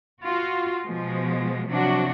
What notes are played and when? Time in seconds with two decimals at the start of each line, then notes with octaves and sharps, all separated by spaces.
0.22 F4 F#4
0.85 B2 F3 G#3
1.68 C3 F3 F#3 D4 F#4